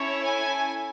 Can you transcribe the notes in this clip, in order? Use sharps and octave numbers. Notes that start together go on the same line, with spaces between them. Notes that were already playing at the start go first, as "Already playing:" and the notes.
Already playing: C#4 E4 A4 C#5
G#5